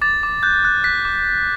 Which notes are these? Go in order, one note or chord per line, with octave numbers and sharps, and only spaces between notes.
D6 A6
D6
F#6 G6
F#6
F#6 B6
D6